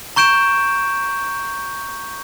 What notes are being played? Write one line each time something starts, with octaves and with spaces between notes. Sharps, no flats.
A#5 C#6 G6 D7 E7